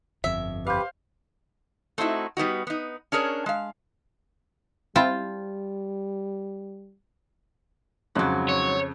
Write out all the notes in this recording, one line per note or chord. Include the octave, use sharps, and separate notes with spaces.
G1 F2 E5
G4 B4 C5 F5
A3 C4 D#4 E4 F#4
G3 B3 D#4 F#4
B3 D#4
C#4 D4 G#4 A#4 C#5
G#3 F5
G3 C4 E4 F4 G5 A5
F2 G#2 C#3 F#3 F#6
C#5